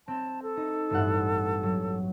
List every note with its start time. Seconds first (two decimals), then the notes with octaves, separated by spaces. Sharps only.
0.08 C4 A5
0.43 A4
0.57 D#4
0.90 A1 G2 F#5
1.63 F#3